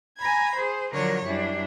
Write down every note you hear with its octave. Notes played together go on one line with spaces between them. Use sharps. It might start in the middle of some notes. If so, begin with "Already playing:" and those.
G#5 A#5 B5 G#6
G#4 C5
D3 F3 F#3 A#4 C#5
F#2 G3 D4 E4